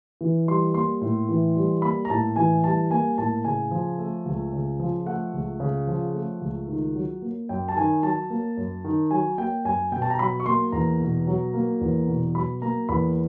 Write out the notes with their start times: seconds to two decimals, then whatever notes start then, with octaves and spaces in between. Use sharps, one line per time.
0.21 E3
0.47 G3 C6
0.74 A#3 C6
1.01 A2
1.29 E3
1.56 G3
1.82 A#3 B5
2.05 A#5
2.10 A2 A5
2.36 E3 G#5
2.64 G3 A5
2.91 A#3 G#5
3.18 A2 A5
3.44 C#3 G#5
3.71 F3
3.98 A3
4.26 C#2
4.53 C#3
4.79 F3
5.06 A3 F#5
5.33 C#2
5.60 C#3
5.87 F3
6.14 A3
6.41 C#2
6.68 D#3
6.95 F#3
7.22 A#3
7.49 F#2 G5
7.68 A5
7.76 D#3 G#5
8.03 F#3 A5
8.30 A#3
8.57 F#2
8.84 D#3
9.11 F#3 G#5
9.38 A#3 G5
9.65 F#2 G#5
9.92 B2 G5
10.02 A5
10.10 A#5
10.19 F#3 B5
10.40 C#6
10.46 A#3 C6
10.72 E2 A#5
11.01 B2
11.27 F#3
11.54 A#3
11.81 E2
12.08 B2
12.35 F#3 B5
12.62 A#3 A#5
12.89 E2 B5